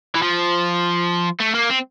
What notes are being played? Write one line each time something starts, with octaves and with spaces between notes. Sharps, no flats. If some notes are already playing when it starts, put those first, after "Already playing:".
E3
F3
A3
A#3
C4